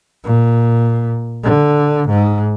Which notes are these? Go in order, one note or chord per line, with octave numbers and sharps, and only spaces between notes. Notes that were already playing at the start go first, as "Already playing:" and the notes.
A#2
D3
G#2